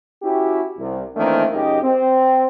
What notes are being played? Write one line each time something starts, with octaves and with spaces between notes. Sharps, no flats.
C#4 E4 F#4 G4
C2
D#3 E3 A3 A#3 C4 D4
C#2 F#2 D#4 G4 D#5
C4